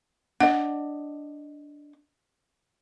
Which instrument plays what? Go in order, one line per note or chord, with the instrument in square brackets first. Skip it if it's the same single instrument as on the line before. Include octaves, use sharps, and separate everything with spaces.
[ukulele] D4 D#5 [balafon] F#5